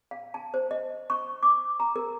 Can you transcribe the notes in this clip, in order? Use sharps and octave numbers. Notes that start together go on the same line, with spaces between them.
F5
A5
C5
D#5
C#6
D6
A#5
A#4